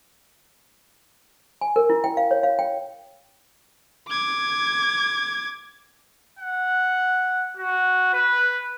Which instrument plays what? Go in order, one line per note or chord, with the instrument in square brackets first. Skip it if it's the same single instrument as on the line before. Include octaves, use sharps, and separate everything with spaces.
[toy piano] G#5
A#4
E4
G5
F5
C#5
F5
G5
[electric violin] D6 G#6
[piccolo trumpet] F#5
F#4
B4